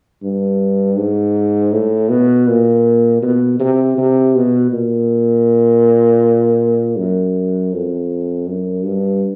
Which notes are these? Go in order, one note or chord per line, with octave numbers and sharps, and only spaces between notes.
G2
G#2
A2
B2
A#2
B2
C3
C3
B2
A#2
F#2
F2
F#2
G2